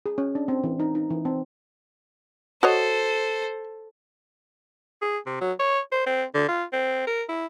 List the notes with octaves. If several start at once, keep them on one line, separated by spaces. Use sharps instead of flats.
G#4
C#4
D4
C4
E3
D#4
D#4
E3
C4
F#4 A4 C5 C#5 D#5
G#4
C3
F#3
C#5
C5
C4
D3
F4
C4
A#4
E4